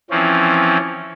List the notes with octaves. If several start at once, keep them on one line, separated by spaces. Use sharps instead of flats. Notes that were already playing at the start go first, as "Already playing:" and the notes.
E3 F3 C4 C#4